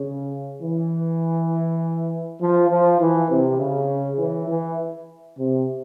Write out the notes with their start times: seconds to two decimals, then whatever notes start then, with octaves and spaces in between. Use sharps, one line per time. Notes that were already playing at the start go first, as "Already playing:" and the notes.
Already playing: C#3
0.61 E3
2.40 F3
2.69 F3
2.99 E3
3.29 C3
3.58 C#3
4.18 E3
4.48 E3
5.37 C3